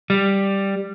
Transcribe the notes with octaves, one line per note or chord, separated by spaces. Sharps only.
G3